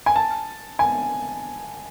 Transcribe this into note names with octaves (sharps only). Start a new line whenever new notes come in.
G#5
A5
G#5